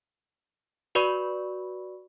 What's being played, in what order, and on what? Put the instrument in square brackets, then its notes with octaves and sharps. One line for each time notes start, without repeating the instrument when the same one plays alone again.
[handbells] F#4 B4 D5 B5 C#6